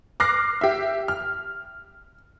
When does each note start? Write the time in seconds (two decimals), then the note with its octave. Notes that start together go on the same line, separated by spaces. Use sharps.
0.20 D6 F6 F#6 A#6 C7
0.61 G4 E5
1.08 F6